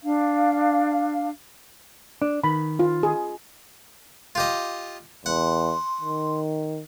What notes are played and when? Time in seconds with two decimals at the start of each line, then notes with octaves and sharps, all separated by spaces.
0.03 D4 F5
2.22 D4
2.44 D#3 B5
2.79 F4
3.03 G#4
4.35 F4 G4 D#5
5.26 E2 F#5 C6
6.01 D#3